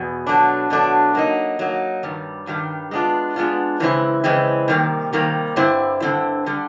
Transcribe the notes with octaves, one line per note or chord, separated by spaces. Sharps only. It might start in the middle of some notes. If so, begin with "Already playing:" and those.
Already playing: E2 B2
B2 F#3 A3 D4
B2 F#3 A3 D4
F#3 A#3 D#4
F#3 A#3 D#4
G2 D#3 G3
G2 D#3 G3
G#3 B3 D4 F4
G#3 B3 D4 F4
C#3 E3 G#3 C4 E4
C#3 E3 G#3 C4 E4
C3 D#3 G3 A#3
C3 D#3 G3 A#3
G2 D3 G3 C4 E4
G2 D3 G3 C4 E4
D3 G3